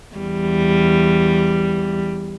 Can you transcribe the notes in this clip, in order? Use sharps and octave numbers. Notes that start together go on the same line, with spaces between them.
E2 G3